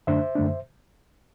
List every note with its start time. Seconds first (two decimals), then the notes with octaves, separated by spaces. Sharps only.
0.07 F#2 D3 A3 D4 C5 E5
0.35 F#2 D3 A3 D4